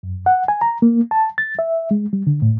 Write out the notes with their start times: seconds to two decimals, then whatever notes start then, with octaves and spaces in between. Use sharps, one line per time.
0.03 F#2
0.26 F#5
0.48 G#5
0.61 A#5
0.82 A#3
1.11 A5
1.38 A6
1.59 E5
1.91 G#3
2.13 G3
2.27 D3
2.42 A2